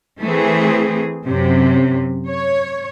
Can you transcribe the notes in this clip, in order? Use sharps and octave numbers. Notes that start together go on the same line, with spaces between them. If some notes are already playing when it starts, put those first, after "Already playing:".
E3 A3 C4 G#4
F#2 C3 F#3
C#5